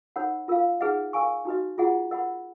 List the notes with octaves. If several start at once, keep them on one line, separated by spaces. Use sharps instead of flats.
D#4 A#4 C#5 F#5 B5
F4 A#4 F5
D#4 G#4 B4 D#5 F#5
A#4 F5 G#5 C#6
D#4 F#4 B4 D#5
F4 G#4 D#5 F#5 A#5
A#4 D#5 F#5 B5